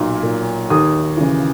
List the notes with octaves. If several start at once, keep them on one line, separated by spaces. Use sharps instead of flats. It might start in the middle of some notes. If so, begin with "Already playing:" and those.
Already playing: B1 A#2
A#2
D#2 D#6
C#3 E3